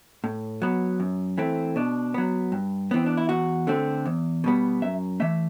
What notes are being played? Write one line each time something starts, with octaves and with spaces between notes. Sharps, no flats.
A2
F#3 B3
F#2
E3 A3 C4
B2 D4
F#3 B3
G2
E3 B3 C4
D4
E4
E2 F#4
D3 A3 C4
E2
B2 G3 B3
F#2 E5
E3 A3 E5